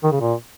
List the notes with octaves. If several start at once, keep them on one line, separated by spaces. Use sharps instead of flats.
D#3
C#3
A#2